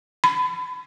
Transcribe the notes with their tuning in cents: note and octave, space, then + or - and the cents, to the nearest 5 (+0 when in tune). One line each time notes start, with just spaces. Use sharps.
B5 +25